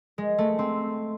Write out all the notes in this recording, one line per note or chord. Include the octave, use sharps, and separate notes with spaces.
G#3
A3
C4